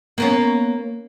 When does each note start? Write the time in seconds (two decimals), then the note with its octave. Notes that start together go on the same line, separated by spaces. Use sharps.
0.18 A#3 B3 C#4